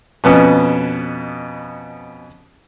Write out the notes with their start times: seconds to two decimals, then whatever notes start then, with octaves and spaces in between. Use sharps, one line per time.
0.24 F2 B2 B3 C#4